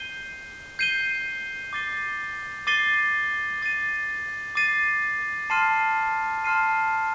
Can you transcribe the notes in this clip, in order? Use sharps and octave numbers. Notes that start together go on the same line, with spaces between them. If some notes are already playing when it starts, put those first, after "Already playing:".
Already playing: G6 C7 D#7 G7
G6 C7 D#7 G7
D6 A6 C7 D#7 G7
D6 A6 C7 D#7 G7
D6 A6 C7 D#7
D6 A6 C7 D#7
A5 C6 F6 C7 D#7
A5 C6 F6 C7 D#7